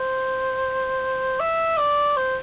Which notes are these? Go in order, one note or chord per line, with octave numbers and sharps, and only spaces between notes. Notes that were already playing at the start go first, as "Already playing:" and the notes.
Already playing: C5
E5
D5
C5